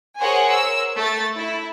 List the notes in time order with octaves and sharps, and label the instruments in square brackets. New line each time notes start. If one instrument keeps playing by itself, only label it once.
[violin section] G#4 A#4 C5 C#5 F#5 G#5
A#4 E6
A3 A6
E4